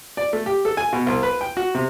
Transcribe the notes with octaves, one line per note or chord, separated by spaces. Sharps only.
D5
A3
G4
A4
G#5
B2
C2
B4
G5
F#4
C3